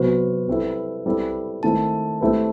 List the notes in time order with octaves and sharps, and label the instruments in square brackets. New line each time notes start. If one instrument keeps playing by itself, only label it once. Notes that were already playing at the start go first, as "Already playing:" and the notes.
Already playing: [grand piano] C3 F#3 B3 F#4 C5 [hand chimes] B4
[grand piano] G3 C4 E4 A4
G3 C4 E4 A4
[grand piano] D#3 A3 C4 E4 [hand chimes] A5
[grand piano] A3 C4 E4 G4 B4